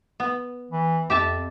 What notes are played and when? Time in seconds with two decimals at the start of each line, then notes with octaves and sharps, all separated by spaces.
0.20 B3
0.72 E3
1.10 F2 G4 E5 A5